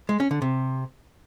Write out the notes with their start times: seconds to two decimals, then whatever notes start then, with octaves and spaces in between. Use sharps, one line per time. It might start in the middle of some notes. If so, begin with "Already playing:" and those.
0.09 G#3
0.20 C#4
0.31 D3
0.42 C3